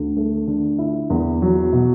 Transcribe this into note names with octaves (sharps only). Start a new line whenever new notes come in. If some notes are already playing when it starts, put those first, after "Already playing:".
Already playing: D2
A3
D3
E4
E2
F#3
B2